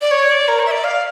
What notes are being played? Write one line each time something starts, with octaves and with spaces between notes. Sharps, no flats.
D5
C#5
D5
A#4
C#5
E5
D5
F5